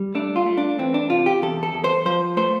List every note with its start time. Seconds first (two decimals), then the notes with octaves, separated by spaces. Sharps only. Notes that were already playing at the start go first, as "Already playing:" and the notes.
Already playing: G3
0.15 A3 D4
0.36 F4
0.46 A3
0.57 D4
0.79 E3 C4
0.94 D4
1.10 C3 F4
1.26 G4
1.42 E2 A4
1.63 A4
1.74 E2
1.84 C5
2.06 F3 C5
2.37 A3 C5